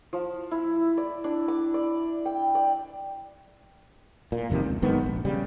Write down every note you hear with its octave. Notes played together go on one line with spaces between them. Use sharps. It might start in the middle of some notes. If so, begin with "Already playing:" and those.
F3
E4
D5
D4
D6
D5
G5
D5
A#2
G1 F2 C3 D#3
C#2
B1 G#2 D#3 B3
A#1
C#3 G3